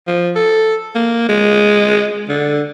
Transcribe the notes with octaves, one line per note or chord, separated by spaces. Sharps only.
F3
A4
A#3
G#3
D3